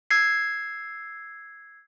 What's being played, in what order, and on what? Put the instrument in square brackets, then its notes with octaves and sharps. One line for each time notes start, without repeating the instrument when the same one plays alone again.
[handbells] E6 G#6 C7